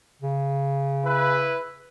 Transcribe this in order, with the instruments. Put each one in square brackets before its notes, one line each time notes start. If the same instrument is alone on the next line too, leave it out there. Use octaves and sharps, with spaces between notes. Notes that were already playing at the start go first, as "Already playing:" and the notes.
[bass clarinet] C#3
[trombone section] E4 B4